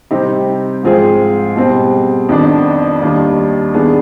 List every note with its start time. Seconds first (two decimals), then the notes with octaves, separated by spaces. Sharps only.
0.11 C3 G3 C4 D#4 G4
0.83 G#2 F3 C4 F4 G#4
1.56 B2 G3 C4
2.29 F2 D#3 B3 D4
3.01 D#2 D#3 G3 D4
3.74 D#3 B3 D4 G#4